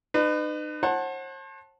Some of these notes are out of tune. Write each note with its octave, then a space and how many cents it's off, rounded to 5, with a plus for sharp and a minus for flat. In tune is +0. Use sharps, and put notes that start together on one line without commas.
D#4 -40 B4 +25
C5 +45 F#5 +0 A5 +0